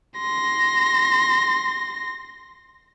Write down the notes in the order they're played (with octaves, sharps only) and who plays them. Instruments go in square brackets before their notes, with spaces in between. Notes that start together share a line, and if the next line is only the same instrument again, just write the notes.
[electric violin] C6 A#6